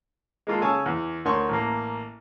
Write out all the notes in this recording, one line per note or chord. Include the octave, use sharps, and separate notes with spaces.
G#3 A#3 F4 A4
C#3 C#5 G#5 A5 E6
E2
D2 A#4 C#5 C6 C#6
A1 A#3